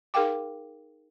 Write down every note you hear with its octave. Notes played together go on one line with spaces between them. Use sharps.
D#4 G#4 A#4 F5 G5 D6